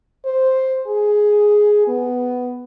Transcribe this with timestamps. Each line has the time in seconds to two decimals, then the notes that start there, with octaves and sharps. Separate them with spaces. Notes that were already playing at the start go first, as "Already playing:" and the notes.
0.25 C5
0.87 G#4
1.88 B3